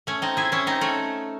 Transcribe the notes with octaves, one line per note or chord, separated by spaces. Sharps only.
A3 C#4
C4 D#4
E4 G#4
C#4 E4
C4 D#4
A3 C#4